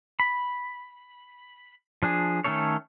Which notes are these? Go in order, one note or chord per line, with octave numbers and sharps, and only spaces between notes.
B5
F3 D4 G#4
D#3 A3 C#4 A4 C#5